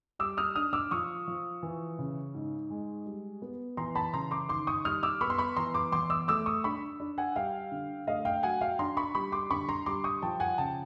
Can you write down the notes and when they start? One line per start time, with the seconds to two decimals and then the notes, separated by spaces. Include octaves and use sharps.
0.19 G3 D6 E6
0.37 D#6 F6
0.55 D4 D#6 F6
0.73 D6 E6
0.91 F3 C#6 D#6
1.28 F3
1.63 E3
1.99 C#3
2.34 G#2
2.70 G#3
3.06 G3
3.42 B3
3.77 E3 A#5 C6
3.95 A5 B5
4.13 C#3 A#5 C6
4.31 C6 D6
4.49 D#3 C6 D6
4.67 C#6 D#6
4.85 G3 D#6 F6
5.03 D6 E6
5.21 B3 B5 C#6
5.30 C6
5.38 B5 C#6
5.56 E3 A#5 C6
5.74 C6 D6
5.92 E2 C6 D6
6.10 D6 E6
6.28 A3 D6 E6
6.46 C#6 D#6
6.64 D4 B5 C#6
7.00 D4
7.18 F#5 G#5
7.36 G3 F5 G5
7.72 D3
8.07 A3 D#5 F5
8.25 F5 G5
8.43 F#3 F#5 G#5
8.61 F5 G5
8.79 D4 A#5 C6
8.97 B5 C#6
9.15 G3 B5 C#6
9.32 C6 D6
9.51 D3 B5 C#6
9.69 A#5 C6
9.86 G3 C6 D6
10.04 C#6 D#6
10.22 F3 G5 A5
10.40 F#5 G#5
10.58 C#3 G5 A5